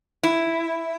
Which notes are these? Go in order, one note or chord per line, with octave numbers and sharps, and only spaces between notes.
E4